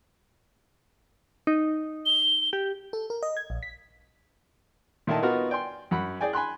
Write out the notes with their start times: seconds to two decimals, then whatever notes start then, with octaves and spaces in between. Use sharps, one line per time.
1.47 D#4
2.06 G7
2.53 G4
2.93 A4
3.10 A#4
3.23 D#5
3.37 G#6
3.50 A#1
3.63 B6
5.07 A#2 D#3 E4 A4 D#5 A5
5.23 B3 D#4 F4 F#4 A#4
5.50 D5 G5 G#5 C6
5.91 F#2 F#5 B5
6.21 G#4 D5 G5 G#5
6.33 G#5 B5 C6 F#6